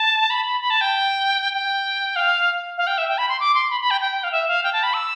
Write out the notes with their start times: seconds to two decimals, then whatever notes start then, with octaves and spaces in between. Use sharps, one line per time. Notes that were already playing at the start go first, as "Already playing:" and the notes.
Already playing: A5
0.30 B5
0.45 B5
0.61 B5
0.70 A5
0.81 G5
1.54 G5
2.16 F5
2.78 F5
2.87 G5
2.98 E5
3.09 G5
3.18 B5
3.29 C6
3.40 D6
3.55 C6
3.70 B5
3.81 B5
3.91 G5
4.01 G5
4.24 F5
4.32 E5
4.48 F5
4.63 G5
4.73 A5
4.83 B5
4.94 E6